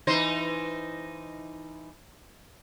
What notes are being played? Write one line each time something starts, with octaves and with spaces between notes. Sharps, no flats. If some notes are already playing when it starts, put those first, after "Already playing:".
E3 D#4 C5